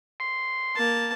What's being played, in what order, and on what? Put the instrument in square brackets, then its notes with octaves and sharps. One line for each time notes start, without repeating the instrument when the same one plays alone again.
[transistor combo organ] C6
[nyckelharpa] A#3 A5